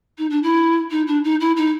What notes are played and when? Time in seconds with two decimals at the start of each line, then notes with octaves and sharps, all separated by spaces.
0.18 D#4
0.30 D4
0.43 E4
0.91 D#4
1.07 D4
1.24 D#4
1.40 E4
1.56 D#4